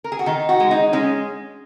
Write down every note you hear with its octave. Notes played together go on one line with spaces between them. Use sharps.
A#4
G#4
F#4
D#3 D#4
F#4
G#3
D#4
G#3 C#4